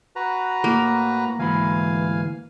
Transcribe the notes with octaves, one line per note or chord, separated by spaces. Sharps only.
F#4 B4 A#5
A2 A#3
D2 G#2 E3 F5 G#5 B5